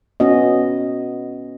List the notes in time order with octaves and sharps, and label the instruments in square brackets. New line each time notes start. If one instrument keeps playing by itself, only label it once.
[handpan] B3 C#4 F#4 D#5